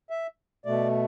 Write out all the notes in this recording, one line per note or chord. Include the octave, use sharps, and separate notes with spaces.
E5
B2 A3 D5